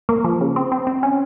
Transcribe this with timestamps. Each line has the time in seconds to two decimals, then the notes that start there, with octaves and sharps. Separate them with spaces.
0.09 A#3
0.24 F3
0.41 C#3
0.56 C4
0.72 C4
0.87 C4
1.03 C#4